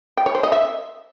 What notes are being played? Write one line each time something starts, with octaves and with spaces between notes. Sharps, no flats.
G5
C#5
C5
D#5
E5